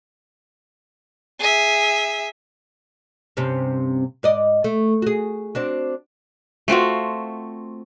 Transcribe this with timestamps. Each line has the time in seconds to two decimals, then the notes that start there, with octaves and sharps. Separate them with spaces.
1.40 G#4 E5
3.37 G2 C3 C#4
4.23 G#2 D5 D#5
4.64 A3
5.02 F#4 G#4
5.55 C4 D4 F#4
6.68 A3 C4 F4 F#4